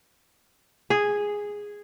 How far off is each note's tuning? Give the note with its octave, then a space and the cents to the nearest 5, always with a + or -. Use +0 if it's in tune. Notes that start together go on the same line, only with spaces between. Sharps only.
G#4 -5